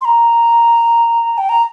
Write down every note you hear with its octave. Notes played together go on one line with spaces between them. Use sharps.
C6
A#5
G5
A#5